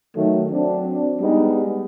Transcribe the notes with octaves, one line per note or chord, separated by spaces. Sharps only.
D#3 F#3 A3
F#3 C4 D4
G3 G#3 B3 D#4